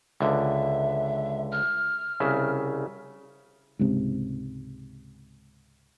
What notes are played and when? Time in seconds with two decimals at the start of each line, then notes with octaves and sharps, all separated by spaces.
0.20 C#2 D3 E5
1.52 F6
2.20 C2 C#3 E5
3.79 C#2 G#2 C3